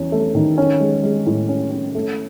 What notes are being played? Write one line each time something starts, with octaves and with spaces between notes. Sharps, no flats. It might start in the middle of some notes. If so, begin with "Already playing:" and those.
Already playing: E2 C#4
A3
D#3
C#4
G#3
G#3
A2
C#4
C#4
A3